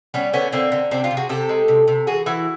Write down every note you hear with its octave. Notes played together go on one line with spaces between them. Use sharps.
G3 B3 C#4
D3 B3 C#4
D3 A#3 C4
D3
C3 C4 D4
F4 G4
C3
F#4 G#4
C3 G4 A4
G#3
C3
C3
E3 F#4 G#4
E3 E4 F#4